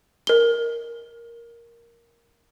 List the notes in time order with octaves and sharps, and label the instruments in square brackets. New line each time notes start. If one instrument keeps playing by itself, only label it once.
[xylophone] A#4 G7